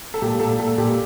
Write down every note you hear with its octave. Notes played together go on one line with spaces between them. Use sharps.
A4
A#2 G4
A#2 A4
A#2 A4
A#2 G4